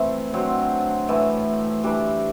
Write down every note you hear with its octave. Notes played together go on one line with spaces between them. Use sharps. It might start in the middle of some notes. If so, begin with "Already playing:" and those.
Already playing: E3 A3 C4
D3 F#3 C4
A2 E3 A3
E3 G3 D4 G4